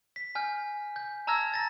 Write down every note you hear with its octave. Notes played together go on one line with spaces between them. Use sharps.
B6
G#5 F6 G6
G6
A5 A#5 E6 F6 G#6 A#6
A6 A#6